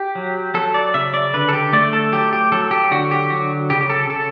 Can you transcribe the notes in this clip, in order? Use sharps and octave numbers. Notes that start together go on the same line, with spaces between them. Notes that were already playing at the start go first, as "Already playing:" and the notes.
Already playing: G4
F#3
F#3 A4
D5
C#3 E5
D5
D3 B4
A4
G4
A3 D5
A4
F#3 G4
G4
F#3 A4
G4
D3 F#4
G4
F#3 F#4
C#3 G4
G4
A4
C#3 A4